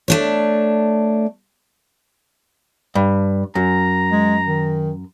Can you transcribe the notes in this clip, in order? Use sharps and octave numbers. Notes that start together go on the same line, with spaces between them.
A3 D4 C#5
G2
F#2 A#5
G#3
D#3